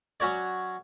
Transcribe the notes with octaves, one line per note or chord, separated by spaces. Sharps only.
F#3 C#4 F#4 C#5 D5